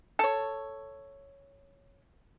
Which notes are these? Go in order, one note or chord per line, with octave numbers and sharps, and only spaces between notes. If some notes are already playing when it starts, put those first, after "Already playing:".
A4 C#5